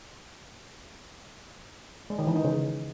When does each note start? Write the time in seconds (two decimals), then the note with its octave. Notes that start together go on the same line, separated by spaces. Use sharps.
2.10 G#3
2.19 D#3
2.27 E3
2.36 D#4
2.44 C#3